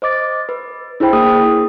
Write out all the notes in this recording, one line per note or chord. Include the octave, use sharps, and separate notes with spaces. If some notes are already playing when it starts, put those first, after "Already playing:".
C5 D#5 D6 A6
B4
D4 E4 G#4 C5 G5 B5
A#3 G#4 D#6